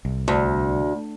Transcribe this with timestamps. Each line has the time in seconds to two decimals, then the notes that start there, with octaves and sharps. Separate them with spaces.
0.05 C2
0.28 D2